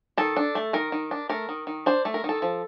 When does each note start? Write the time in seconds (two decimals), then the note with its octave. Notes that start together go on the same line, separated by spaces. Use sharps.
0.17 D#3 A4
0.36 D4
0.55 A3
0.73 D#3 A#4
0.92 D#3
1.11 D4
1.29 A3 A#4
1.49 D#3
1.67 D#3
1.86 D4 C5
2.05 A3
2.14 A#4
2.24 D#3 A4
2.42 F3